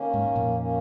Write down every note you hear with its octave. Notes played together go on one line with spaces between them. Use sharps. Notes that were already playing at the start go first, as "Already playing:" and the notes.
Already playing: D#3 A#3 C#4
G#2
F2 A#2
D#3 A#3 C#4